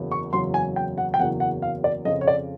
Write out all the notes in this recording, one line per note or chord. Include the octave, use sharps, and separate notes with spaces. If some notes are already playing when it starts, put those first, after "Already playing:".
Already playing: F#1 E2 C#3 F#3
C#6
F#1 E2 C#3 F#3 C6
G#5
G5
F#5
G5
F#1 E2 C#3 F#3 F#5
F#5
F5
D5
F2 C#3 F3 D#5
C#5
D5